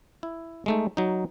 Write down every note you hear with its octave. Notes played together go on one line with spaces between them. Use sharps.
E4
G#3 A3 D#4
F#3 D#4